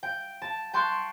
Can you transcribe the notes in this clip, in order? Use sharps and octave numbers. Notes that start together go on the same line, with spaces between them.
G5
A5
G5 A5 C6 C#6 F#6